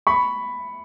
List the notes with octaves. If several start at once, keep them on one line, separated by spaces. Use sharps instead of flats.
B5 C#6